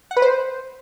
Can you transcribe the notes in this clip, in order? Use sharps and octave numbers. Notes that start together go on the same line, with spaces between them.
F#5
B4
C5